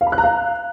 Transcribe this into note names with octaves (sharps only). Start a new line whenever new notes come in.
F5
B5
F#6
A#5
F5